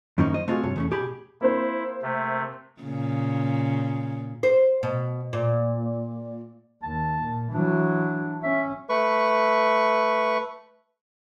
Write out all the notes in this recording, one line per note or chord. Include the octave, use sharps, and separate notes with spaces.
F#2 D#3 F3 A#3 C#4 D#4
C5 D#5
A3 C4 F4 F#4 G#4
G2 C3 C#5
E2 A3 C#4
B2 G4 G#4 B5
A#3 C4 E4 C5
C3 A3
A#2 C#3
C5
B2
A#2
D#2 A5
A#2
E3 F#3 D4
C#4 E5
A3 B4 C#6